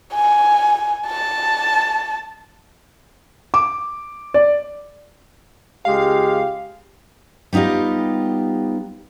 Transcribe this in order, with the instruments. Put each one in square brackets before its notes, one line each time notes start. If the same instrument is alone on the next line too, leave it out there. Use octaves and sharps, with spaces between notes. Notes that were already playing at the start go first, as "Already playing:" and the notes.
[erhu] G#5
A5
[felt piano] D6
[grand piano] D5
[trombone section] C#2 G#3 G4 [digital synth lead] F5
[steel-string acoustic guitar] G3 B3 D#4 F4 G4